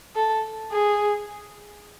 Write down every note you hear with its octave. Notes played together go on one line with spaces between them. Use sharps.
A4
G#4